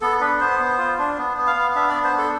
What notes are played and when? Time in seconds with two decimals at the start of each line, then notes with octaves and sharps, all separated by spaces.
0.01 B3 A4
0.21 D4 B4
0.40 B3 C5
0.60 B3
0.78 F4
0.99 D4
1.18 B3
1.37 B3
1.47 F5
1.56 B3
1.75 D4 E5
1.89 D5
1.95 B3
2.04 C5
2.13 D4
2.18 A4